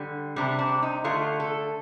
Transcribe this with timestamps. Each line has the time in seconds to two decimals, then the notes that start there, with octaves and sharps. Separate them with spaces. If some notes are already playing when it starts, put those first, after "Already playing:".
Already playing: D3 G3
0.36 C3 G3 D4
0.59 D4
0.83 D#4
1.04 D3 A3 F4
1.40 A4